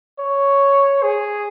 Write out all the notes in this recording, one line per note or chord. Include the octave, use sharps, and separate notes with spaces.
C#5
G#4